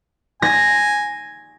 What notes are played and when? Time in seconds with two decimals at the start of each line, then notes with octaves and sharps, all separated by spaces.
0.42 G#5 A#6